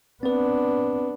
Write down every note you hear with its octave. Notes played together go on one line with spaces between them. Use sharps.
B3 C4 D4 B4